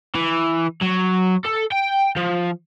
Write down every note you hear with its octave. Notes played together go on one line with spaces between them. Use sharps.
E3
F#3
A4
G5
F3